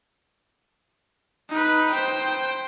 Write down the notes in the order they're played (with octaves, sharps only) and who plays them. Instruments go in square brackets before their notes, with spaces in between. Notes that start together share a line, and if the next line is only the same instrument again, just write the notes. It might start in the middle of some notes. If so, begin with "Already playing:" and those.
[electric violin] D#4 B4
C5 G5